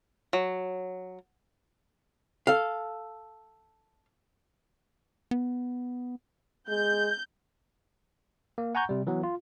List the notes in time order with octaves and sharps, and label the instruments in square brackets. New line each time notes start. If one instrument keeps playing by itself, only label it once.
[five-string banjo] F#3
[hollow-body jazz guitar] A4 F5
[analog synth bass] B3
[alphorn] G#3 [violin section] G6
[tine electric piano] A#3
F#5 G#5 A#5 C#6 G6
C3 G3
E3 F#3 B3
F4